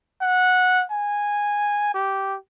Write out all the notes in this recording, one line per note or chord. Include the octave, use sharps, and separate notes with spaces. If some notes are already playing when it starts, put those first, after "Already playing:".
F#5
G#5
G4